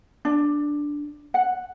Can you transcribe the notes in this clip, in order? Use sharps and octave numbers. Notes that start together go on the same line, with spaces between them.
D4
F#5